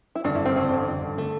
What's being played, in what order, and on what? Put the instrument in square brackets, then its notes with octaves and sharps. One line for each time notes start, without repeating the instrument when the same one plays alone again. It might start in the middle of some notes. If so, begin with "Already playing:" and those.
[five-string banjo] E4
[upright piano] A1 G2 D3 [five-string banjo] D4
[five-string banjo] E4
C4
[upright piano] A1 G2 D3 [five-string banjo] C4
[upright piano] A1 G2 D3
[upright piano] D3 [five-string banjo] A3